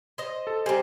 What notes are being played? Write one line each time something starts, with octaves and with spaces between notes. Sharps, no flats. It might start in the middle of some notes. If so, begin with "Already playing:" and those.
C5 D#5
A4
G3 A#3 C4 C5 G#5